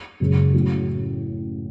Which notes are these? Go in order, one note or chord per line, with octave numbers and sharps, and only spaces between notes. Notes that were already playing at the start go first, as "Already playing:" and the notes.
F#1 F#2 C#3 G#3
A1 A2 F#3